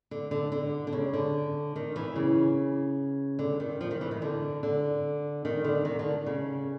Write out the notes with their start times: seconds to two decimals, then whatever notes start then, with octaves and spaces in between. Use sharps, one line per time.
0.11 D3
0.31 D3
0.52 D3
0.87 D3
0.93 C#3
1.13 D3
1.76 D#3
1.96 E3
2.16 C#3
3.39 D3
3.60 D#3
3.81 F3
3.91 D#3
4.01 E3
4.11 D#3
4.22 D3
4.63 D3
5.45 D#3
5.64 D3
5.85 D#3
5.99 D3
6.26 C#3